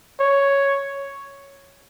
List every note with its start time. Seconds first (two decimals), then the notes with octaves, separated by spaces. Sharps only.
0.19 C#5